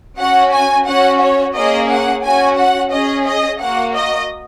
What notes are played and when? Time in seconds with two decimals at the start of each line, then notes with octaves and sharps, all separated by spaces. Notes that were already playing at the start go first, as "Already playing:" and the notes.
0.18 C#4 F#4 F#5
0.53 G#5
0.87 C#4 F#4 F#5
1.21 C#5
1.55 A#3 C#4 G#4 D#5
1.90 F#5
2.24 C#4 F#4 G#5
2.57 F#5
2.92 C#4 G#4 D#5
3.26 D#5
3.61 A#3 F#4 F#5
3.95 D#5